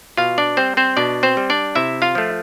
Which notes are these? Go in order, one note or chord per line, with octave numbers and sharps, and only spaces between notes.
B2 F4 F5
D4 D5
G3 C4 C5
C4 C5
B2 D4 D5
C4 C5
G3
D4 D5
C3 E4 E5
F4 F5
F3 A3